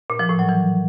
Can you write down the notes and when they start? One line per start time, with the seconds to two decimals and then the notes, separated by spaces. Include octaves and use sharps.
0.10 A#2
0.19 F3
0.29 A2
0.39 F#3
0.49 E3